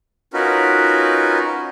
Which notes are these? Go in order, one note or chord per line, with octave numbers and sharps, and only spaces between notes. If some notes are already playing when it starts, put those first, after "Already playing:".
C#4 D#4 F4 F#4 A#4 B4